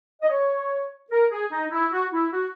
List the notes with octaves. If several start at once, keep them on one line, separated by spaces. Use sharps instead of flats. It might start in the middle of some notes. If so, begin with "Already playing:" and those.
D#5
C#5
A#4
G#4
D#4
E4
F#4
E4
F#4